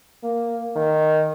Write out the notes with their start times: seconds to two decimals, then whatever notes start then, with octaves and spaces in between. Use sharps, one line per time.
0.23 A#3
0.76 D#3